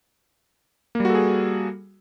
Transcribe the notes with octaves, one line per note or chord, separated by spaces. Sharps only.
G3 A#3 F#4 G#4 A4